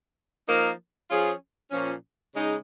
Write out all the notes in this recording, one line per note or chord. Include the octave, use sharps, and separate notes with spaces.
F3 A#3 D#4 A#4
F3 C#4 F4 G#4
A#2 F3 C#4
C#3 G#3 D#4